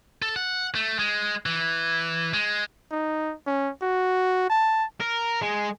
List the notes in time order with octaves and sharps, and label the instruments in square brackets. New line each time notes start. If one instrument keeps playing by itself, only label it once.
[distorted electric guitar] A4
F#5
A3
G#3
E3
G#3
[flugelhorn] D#4
C#4
F#4
A5
[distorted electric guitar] A#4
G#3